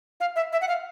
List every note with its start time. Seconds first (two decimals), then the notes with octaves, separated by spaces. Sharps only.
0.20 F5
0.36 E5
0.52 E5
0.61 F#5
0.68 F5